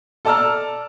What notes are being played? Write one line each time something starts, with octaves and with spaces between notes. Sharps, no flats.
A4 D5 A5 A#5 E6 F6